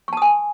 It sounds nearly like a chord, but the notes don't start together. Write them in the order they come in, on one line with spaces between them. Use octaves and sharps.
C#6 A5 D#6 G#5